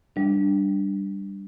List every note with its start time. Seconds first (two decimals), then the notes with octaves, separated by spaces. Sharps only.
0.16 G3 D4